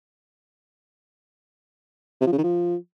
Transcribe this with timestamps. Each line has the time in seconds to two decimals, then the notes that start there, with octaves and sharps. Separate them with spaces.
2.21 C3
2.27 F3
2.32 C#3
2.38 D#3
2.43 F3